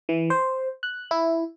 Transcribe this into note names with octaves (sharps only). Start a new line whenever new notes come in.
E3
C5
F#6
E4